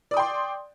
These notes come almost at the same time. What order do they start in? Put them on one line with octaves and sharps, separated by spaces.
D5 D#6 G5 C6